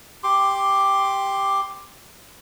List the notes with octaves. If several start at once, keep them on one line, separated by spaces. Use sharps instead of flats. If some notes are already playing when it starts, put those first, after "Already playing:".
G4 C6 D6